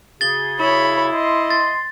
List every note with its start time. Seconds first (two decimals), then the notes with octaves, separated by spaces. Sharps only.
0.21 C#3 F#4 G#4 A6 G7
0.60 E4 C#5 B5
1.14 D#5 C6
1.50 A6